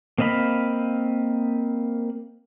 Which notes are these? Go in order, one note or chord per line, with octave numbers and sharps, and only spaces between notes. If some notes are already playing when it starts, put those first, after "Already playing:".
A#3 C4 D#5 F5 B5